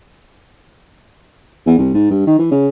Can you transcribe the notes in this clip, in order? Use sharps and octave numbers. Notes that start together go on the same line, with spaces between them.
E2
C2
G#2
G2
D#3
E3
C#3